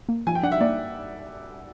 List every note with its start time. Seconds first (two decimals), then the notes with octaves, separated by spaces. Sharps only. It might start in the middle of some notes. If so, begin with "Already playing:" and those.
0.09 A#3
0.27 F3 G#5
0.35 G5
0.43 D4 F#5
0.52 E5
0.61 A#3 D5